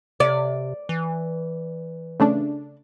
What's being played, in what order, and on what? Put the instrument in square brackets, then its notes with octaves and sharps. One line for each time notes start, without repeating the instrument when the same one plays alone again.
[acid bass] C3 [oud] D5
[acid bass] E3
[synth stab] C#3 A3 D4